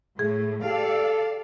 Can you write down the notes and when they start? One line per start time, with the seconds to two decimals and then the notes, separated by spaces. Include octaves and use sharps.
0.19 A2 A3 G#4
0.64 G4 A4 D5 F5